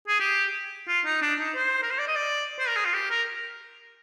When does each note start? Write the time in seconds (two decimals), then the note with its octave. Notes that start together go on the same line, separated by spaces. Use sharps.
0.08 G#4
0.20 G4
0.88 F4
1.05 D#4
1.22 D4
1.39 D#4
1.56 C5
1.82 A#4
1.91 C5
1.98 D5
2.08 D#5
2.15 D5
2.59 C5
2.67 A#4
2.76 G#4
2.85 F4
2.93 G4
3.10 A#4